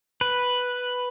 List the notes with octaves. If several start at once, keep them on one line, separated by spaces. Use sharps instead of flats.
B4